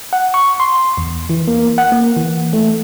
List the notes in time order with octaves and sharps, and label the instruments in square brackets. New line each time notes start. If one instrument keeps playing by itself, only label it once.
[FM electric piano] F#5
C#6
C6
E2
E3
A#3
F#5
A#3
E3
A3